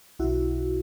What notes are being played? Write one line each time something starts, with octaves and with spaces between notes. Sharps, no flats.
B1 B2 E4 F#4